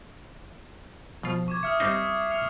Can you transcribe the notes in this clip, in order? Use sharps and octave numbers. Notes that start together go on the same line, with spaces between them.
B2 F3 F4
C#6 D6 G#6
E5 D#6 F6 C#7
G3 C4 D#4 C7
F6 C#7 F7